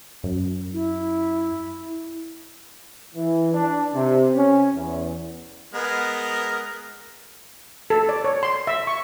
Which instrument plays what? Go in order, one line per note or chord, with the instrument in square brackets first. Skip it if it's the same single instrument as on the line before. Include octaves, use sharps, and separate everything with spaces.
[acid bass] F#2
[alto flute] E4
[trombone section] E3
D4
C3
C#4
E2
[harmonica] G#3 B3 A#4
[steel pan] A4
D5
C#5
C6
E5
C#6